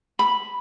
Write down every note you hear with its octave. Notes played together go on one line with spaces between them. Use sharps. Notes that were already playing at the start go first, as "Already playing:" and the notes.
B5